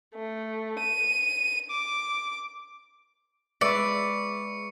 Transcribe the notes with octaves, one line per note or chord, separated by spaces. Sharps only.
A3
D#7
D6
G#3 B4 D5 E5 C#6 C#7